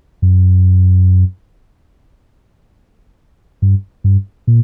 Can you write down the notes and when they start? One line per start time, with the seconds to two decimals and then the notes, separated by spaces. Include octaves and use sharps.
0.22 F#2
3.62 G2
4.04 G2
4.47 A#2